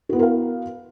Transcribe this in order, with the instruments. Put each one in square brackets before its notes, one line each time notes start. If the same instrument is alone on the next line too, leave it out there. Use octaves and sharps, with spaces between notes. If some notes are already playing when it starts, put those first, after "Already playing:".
[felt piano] F#4
B3
E4
A#4
F5